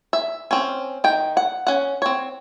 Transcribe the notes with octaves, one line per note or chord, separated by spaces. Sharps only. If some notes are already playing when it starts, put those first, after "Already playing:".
E5
C4 C#4
D#3 G5
F#5
C#4 F#5
C4 C#5